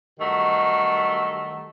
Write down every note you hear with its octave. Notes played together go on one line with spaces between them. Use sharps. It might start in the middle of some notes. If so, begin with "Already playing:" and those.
G2 D#3 F#3 A3